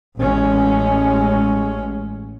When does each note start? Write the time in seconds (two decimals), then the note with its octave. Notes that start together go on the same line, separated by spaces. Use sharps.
0.20 A1 A2 G#3 C#4